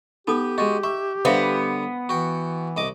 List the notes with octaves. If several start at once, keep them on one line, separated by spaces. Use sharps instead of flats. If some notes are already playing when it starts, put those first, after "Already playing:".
B3 D#4 G4 A4 D#6
G#3 F#4 D#5
E5 C#6
D3 G3 B3 A#4 C5 E5 F5
E3 F#4 G5
C2 D#5 D6